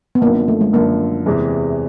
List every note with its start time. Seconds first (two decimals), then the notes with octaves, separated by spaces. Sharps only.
0.15 B3
0.21 F#2 D3 F3 A#3
0.35 A#3
0.48 A3
0.61 G#3
0.73 F#2 D3 F3 A#3
1.26 E2 C3 E3 G#3